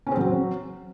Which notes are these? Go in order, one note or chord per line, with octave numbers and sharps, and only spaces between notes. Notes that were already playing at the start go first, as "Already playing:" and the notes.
C#4
C4
F#3